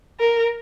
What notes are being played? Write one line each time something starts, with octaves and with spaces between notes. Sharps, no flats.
A#4